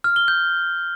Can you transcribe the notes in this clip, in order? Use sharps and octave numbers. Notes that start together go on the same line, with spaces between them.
F6
G7
G6